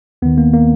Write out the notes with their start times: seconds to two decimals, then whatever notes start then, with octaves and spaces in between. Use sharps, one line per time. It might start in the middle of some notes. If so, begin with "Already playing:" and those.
0.22 D#2 D#3 B3
0.38 A#3
0.53 A#3